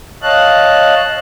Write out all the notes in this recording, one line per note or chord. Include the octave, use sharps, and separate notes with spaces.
C#5 D#5 F5 A5 F#6